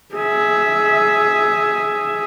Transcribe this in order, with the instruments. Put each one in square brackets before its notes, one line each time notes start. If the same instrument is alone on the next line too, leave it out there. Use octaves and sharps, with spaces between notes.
[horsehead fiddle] G#4 E5